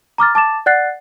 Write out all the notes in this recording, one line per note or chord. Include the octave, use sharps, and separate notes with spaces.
A#5 D6 F6 A6
A5 D6 A6 E7
D5 F#5 F#6 A6 C7